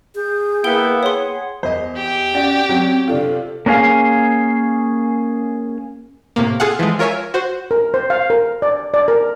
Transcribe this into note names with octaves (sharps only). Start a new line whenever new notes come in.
G#4 G6
A#3 B3 E4 G5 G7
G#4 C#5 F#5 C6
E2 C5 D#5
G4
C#4 F#4 D5 G5
F#3 C4
C3 D4 F4 A4
A#3 C#4 D4 G#4 F5
A2 C3 A#3
F4 G#4 A4 F5 F#5
E3 F3 G#3
F4 A#4 C#5 E5 G#5
F#4 C5
A#4
C5
F5
A#4
D5
D5
A#4